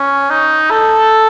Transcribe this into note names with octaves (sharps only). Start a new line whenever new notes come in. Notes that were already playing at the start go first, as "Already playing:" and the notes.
Already playing: C#4
D#4
A4